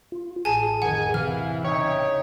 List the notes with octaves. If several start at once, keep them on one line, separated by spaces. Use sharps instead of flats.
F4
A1 G#4 G#5 A5
F2 D#3 F#5 G#5
C3 E3 F5 F6
C#3 D#4 C#5 E5 G5